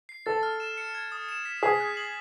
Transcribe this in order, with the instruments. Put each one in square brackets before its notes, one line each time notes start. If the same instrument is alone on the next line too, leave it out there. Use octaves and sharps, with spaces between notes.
[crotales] C7
[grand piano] A4 [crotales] A6
[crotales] F6
E7
C#7
G#6
D#6
E7
B6
[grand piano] G#4 [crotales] B6
[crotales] F#6
F#7